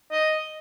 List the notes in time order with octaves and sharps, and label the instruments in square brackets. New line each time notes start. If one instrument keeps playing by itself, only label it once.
[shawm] D#5